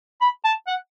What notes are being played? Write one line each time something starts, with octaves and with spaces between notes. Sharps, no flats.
B5
A5
F#5